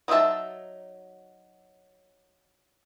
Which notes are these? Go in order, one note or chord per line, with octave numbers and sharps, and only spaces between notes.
F#3 D#4 F#4 E5 A5